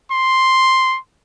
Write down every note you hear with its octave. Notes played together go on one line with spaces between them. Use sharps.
C6